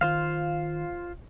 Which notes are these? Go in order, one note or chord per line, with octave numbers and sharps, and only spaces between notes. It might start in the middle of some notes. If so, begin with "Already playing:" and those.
D#3 F4 C5 F5